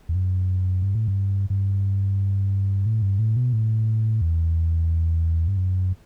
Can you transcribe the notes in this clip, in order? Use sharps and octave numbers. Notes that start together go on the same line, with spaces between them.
E2
F#2
G2
A2
G2
G2
A2
G2
A2
B2
A2
E2
G2
F#2